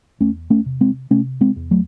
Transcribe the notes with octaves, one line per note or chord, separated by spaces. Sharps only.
E2 A3 C#4
A3 C#4
C3
G#3 C4
C3 A3 C#4
G#3 C4
E2
F#3 A3